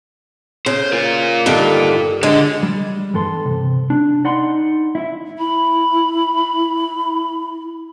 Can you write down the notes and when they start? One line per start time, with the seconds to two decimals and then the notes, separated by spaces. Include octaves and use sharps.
0.66 C#3 C5
0.93 F4 A#4
1.46 G2 D3 D#3
2.23 D3 G#3
2.63 G3
3.14 E2 G2 A4 C6
3.46 C3
3.90 D4
4.25 D#4 D5 F#5 B5 C6
4.95 E4 E5
5.39 E4 B5